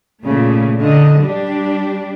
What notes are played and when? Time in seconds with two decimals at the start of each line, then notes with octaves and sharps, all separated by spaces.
0.22 A#2 C#3 A3
0.79 D3 D#5
1.19 G3 D4 G4